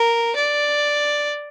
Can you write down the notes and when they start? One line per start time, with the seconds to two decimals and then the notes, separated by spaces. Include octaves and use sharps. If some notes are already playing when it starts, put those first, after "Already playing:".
Already playing: A#4
0.36 D5